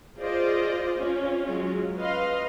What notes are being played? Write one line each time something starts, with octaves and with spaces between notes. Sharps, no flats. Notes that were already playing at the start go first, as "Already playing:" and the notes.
F4 G#4 C5 D5 D#5
C#4 F4
F#3 G#3 C#4 F4
B4 D#5 F5 C6